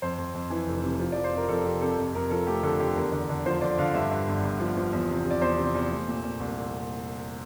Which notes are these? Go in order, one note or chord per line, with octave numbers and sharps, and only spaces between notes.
F2 C5
F2
F2
E3
F1
C3
F3
F3 D5
C5
F2 A#4
F2 A4
C3 G4
C3 A4
F2
F2 A#4
F3 A4
A3 G4
D3 A4
D3 G4
E2 A#4
D3
D3
F3 C5
D3 D5
D3 F5
G2 E5
G2
G1
G1
F3
F3
E2
C3
C3
D5
E2 C5
C3
E2
A3
A#2
A#2
C2